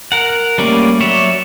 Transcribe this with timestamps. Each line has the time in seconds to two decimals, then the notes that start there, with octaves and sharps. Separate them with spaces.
0.12 A#4 F#5
0.58 G3 A3 A#3 C#4 D5
1.00 F#3 C#5 D5 E5